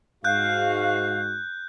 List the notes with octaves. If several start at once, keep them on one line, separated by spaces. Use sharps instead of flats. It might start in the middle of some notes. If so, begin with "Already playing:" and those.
G#2 F#4 F5 F#6 G6